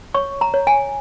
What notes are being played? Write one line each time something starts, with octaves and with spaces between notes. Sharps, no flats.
C#5 C#6
A#5
C#5
G#5